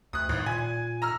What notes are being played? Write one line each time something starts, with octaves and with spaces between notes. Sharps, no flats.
D2 D#6 F#6
G#1 A2
A#2 G#5
A#5 E6 F6